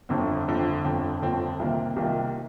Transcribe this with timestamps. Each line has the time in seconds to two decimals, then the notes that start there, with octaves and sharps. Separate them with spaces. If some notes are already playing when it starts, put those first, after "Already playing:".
0.09 G1 F2 D3 F3 C4
0.47 G1 F2 D3 F3 C4
0.84 G1 F2 D3 F3 C4
1.22 G1 F2 D3 F3 C4
1.59 C2 C3 D#3 A#3 F4
1.96 C2 C3 D#3 A#3 F4